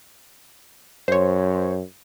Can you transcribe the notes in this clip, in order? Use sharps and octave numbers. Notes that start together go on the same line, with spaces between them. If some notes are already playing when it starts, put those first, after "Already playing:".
F#2 C5 C#5